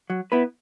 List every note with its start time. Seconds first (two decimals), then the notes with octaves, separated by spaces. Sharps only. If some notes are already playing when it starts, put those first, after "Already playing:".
0.10 F#3
0.32 B3 E4 B4